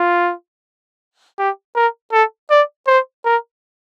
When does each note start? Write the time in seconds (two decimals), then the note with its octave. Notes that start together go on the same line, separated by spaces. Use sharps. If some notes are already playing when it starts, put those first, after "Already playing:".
Already playing: F4
1.38 G4
1.76 A#4
2.12 A4
2.51 D5
2.87 C5
3.25 A#4